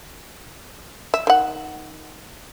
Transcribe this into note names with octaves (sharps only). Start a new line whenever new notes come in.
E5
D#3 F#5